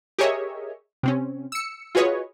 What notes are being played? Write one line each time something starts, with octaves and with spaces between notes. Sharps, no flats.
G4 G#4 A#4 C#5 D#5 E5
C3 C4 C#4
E6 C#7
F4 F#4 G#4 B4 C#5 D#5